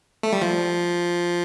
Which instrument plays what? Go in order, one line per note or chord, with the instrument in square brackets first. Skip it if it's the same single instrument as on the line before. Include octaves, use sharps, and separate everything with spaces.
[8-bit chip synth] A3
G3
F3